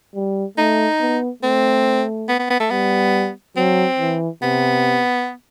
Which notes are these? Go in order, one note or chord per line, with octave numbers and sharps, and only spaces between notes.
G3
A3 D#4
B3
A3 C4
B3
B3
B3
A3
G3 B3
F#3 C4
E3
C3 B3